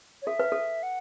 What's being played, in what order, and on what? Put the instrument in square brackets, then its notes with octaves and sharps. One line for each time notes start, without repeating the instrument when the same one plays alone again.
[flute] C#5
[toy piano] A4 [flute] E5
[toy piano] B4
A4
[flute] F#5